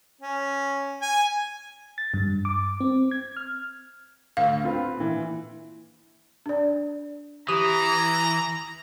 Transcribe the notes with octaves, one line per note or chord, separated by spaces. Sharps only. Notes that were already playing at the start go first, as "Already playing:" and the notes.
C#4
G#5
A6
G2
D6
C4
G#6
F6
D2 F5
C4 F4 B4
A#2 E3
D4 D5
E3 G4 A#5 D#6